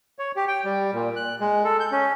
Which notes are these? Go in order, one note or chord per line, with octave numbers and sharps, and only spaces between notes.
C#5
G4
G5
G3
A#2
F#6
G#3
A4
G6
C#4